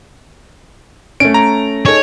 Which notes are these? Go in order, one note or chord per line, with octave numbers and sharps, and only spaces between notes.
A3 C#4 D7
A#5
D#4 G#4 A4 C#5